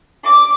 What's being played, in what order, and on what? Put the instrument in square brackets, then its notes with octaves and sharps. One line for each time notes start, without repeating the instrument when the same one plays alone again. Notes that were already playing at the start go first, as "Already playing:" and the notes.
[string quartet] D6